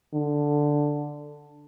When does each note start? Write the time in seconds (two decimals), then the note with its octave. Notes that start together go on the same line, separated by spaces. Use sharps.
0.14 D3